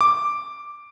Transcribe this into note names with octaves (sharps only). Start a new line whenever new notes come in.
D6